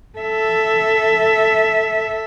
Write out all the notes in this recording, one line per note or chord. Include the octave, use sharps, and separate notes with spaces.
A4 E5